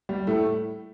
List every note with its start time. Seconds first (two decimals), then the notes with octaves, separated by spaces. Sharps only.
0.09 G3
0.27 A2 A3